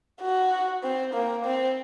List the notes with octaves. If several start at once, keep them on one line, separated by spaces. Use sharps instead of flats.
F#4
C4
A#3
C4